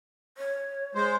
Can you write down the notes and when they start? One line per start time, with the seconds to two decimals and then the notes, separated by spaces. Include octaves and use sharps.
0.38 C#5
0.95 G#3 C5